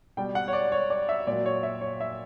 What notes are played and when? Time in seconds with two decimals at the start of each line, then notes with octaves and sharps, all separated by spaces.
0.17 B2 G3 G5
0.35 F#5
0.48 C#5
0.53 D5
0.72 C#5
0.90 D5
1.09 E5
1.27 A#2 F#3 D5
1.46 C#5
1.63 E5
1.81 C#5
2.01 E5